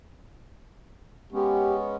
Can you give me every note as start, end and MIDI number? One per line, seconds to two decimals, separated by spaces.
1.32 1.96 56
1.32 1.96 59
1.32 1.96 61
1.32 1.75 67